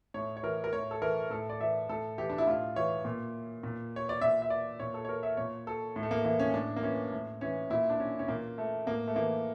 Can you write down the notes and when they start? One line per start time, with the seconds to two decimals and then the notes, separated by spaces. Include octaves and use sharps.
0.14 A2 C#5
0.37 C#5
0.43 E3 A#4
0.64 A#4
0.73 A2 C#5
0.91 A4
1.02 E3 A#4
1.30 A2 A4
1.50 D5
1.60 E3 E5
1.89 A2 A4
2.18 E3 G4
2.30 D4
2.38 E4
2.47 A2 F4
2.76 E3 C#5
3.05 A#2
3.63 A#2
3.96 C#5
4.09 D5
4.21 A#2 E5
4.42 E5
4.50 D5
4.80 A#2 C#5
4.94 A4
5.05 C#5
5.09 A#4
5.23 E5
5.37 A#2 C#5
5.67 A4
5.96 A2
6.03 A3
6.11 A#3
6.25 E3 A#3
6.39 C#4
6.54 A2 D4
6.76 A#3
6.83 E3 C#4
7.12 A2
7.41 E3 C#4
7.70 A#2 E4
7.90 D4
8.00 C#4
8.19 C#4
8.28 A#2 A#3
8.58 A3
8.86 A2 A#3
9.08 A3
9.15 E3 A#3